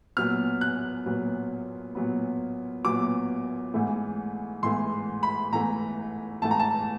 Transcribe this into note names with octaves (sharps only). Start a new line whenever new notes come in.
A#2 F#3 B3 F6
F#6
A#2 F#3 B3
A#2 F#3 B3
A#2 F#3 B3 D6
G#2 E3 A3
G#2 E3 A3 C6
B5
G#2 E3 A3 A#5
G#2 E3 A3 A5
A#5
A5